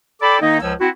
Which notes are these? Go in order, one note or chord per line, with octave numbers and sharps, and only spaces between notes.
A4 D5 G5 B5 D6
D#3 A#3 D#4
C#2 F3 C#5 E6
C4 E4 F#4